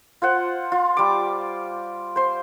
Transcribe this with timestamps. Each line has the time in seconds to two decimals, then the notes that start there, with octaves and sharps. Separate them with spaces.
0.22 F4 C5 F#5
0.72 F4
0.97 G3 D6
2.16 C5 C6